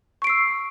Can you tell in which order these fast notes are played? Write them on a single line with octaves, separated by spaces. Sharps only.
C#6 D7 C7 E6